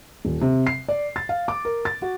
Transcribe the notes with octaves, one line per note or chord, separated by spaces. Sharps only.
D#1
C3
C7
D5
A6
F5
D6
A#4
A6
F#4